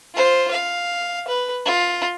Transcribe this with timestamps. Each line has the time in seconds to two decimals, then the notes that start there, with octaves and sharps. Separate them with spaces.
0.14 F4 C5
0.51 F5
1.28 B4
1.65 F4